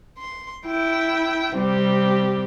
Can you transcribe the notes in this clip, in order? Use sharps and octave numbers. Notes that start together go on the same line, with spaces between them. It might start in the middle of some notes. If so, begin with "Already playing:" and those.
C6
E4 G5
C3 G3 C4 G4